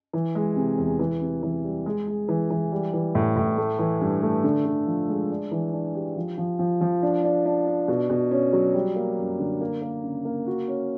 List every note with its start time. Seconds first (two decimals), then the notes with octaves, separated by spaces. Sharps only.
0.13 E3
0.35 G#3
0.56 C3
0.78 E2
0.99 E3
1.21 C3
1.43 E3
1.64 G3
1.86 G#3
2.07 G#3
2.29 E3
2.50 E3
2.72 G3
2.93 E3
3.15 A2
3.36 A2
3.58 A3
3.79 E3
4.01 G2
4.22 A3
4.44 D3
4.65 D3
4.87 F3
5.09 G#3
5.30 D4
5.52 E3
5.73 D4
5.95 G4
6.16 F3
6.38 F3
6.59 F3
6.81 F3
7.03 D4
7.24 D4
7.46 D4
7.67 D4
7.88 B2
8.10 B2
8.31 C#4
8.53 F#3
8.74 G3
8.96 A#3
9.18 F#2
9.39 D3
9.61 A#3
9.82 A#3
10.04 C#3
10.25 A#3
10.47 F#4
10.68 C#4